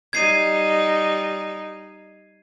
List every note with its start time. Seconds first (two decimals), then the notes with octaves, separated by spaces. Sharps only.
0.13 G3 D#4 G#6 C7 D#7